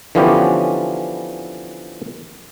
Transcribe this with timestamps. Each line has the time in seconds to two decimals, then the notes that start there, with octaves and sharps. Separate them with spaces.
0.15 D3 E3 F3 B3 C#4 G4